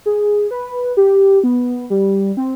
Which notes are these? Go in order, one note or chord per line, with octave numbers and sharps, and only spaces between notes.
G#4
B4
G4
B3
G3
C4